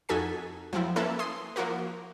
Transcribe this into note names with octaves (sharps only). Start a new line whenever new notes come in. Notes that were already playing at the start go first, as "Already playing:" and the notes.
F2 D#4 F#4 A4 G#5 B6
F3 F#3 C4 E4
A#3 C#4 E4 A4 B4
G#5 C6 D#6
F3 A#3 E4 F#4 A#4